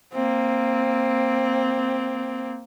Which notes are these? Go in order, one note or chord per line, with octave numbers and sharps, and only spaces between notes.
A#3 C4